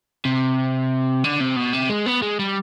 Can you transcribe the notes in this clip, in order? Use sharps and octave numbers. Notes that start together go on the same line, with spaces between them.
C3
D3
C3
B2
C3
G#3
B3
G#3
G3